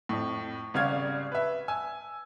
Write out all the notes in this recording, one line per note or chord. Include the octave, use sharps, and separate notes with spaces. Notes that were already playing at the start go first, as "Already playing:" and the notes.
F2 A2
G#1 C#3 G3 F5 F6 G#6
B4 E5
G#5 E6